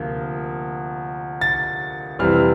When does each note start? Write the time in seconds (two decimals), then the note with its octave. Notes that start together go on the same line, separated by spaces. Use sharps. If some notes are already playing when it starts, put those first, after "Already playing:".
Already playing: D2 C3 F3 A#3
1.41 A6
2.19 F2 C3 E3 G3 C4 F6